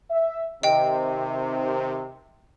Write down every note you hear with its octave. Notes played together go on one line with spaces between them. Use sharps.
E5
C3 D#3 D#5 G5